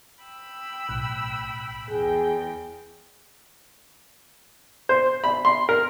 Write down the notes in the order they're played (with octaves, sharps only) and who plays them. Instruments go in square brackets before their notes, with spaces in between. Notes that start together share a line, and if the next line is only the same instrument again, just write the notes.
[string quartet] G5 B5 E6
[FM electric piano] B1 A2 F#6
[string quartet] E2 G5 [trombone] G#4
[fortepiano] C5
B5
C6
A#4